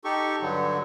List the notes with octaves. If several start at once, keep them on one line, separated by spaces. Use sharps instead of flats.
D#4 G4 A4 C#6
G2 D3 F#3